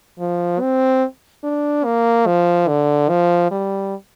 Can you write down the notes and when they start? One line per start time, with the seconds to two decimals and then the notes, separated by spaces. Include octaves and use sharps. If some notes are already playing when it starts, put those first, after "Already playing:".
0.20 F3
0.61 C4
1.44 D4
1.85 A#3
2.27 F3
2.68 D3
3.09 F3
3.51 G3